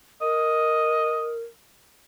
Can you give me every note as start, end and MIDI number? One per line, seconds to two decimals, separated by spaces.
0.21 1.40 70
0.21 1.33 75